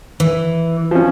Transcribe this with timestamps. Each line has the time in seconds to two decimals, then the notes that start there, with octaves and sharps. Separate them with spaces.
0.20 E3
0.91 F3 C#4